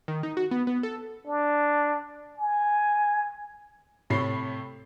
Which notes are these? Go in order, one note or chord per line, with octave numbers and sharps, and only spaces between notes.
D#3
D#4
F#4
B3
B3
A4
D4
G#5
A2 C3 A3 C#5 B5 C7